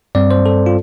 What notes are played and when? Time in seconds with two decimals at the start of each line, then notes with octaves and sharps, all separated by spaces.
0.15 G2 G3 C4 D5
0.31 C5
0.46 A4
0.66 F4